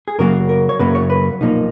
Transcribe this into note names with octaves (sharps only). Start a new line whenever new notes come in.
G#4
F#2 C#3 F#3 A#3 A#4
A#4
C#5
F#2 C#3 F#3 A#3 B4
C#5
B4
B1 A#2 F3 A#3 D#4